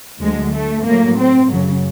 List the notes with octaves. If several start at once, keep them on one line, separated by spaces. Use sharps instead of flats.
D2 D3 F#3 G#3
A3
A2 F#3 A#3
C4
F#2 C#3 F#3